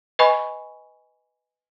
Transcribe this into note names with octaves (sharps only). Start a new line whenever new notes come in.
B4 D#5 G#5 B5 C#6